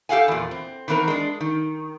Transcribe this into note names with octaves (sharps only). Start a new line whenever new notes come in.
G4 A4 F5 F#5 G#5
E2 A#2
C4
D#3 E3 B3 C4 A#4
G#3 D4
D#3